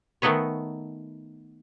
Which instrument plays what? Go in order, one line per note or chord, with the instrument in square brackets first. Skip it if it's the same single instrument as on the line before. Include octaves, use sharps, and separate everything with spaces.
[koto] D#3 A3 B3 D#4 B4 C#5